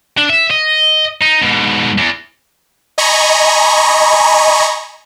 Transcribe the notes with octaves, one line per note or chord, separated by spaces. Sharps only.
D4
E5
D#5
D#4
G#2 B2
E2
D#5 G#5 A#5 B5 C#6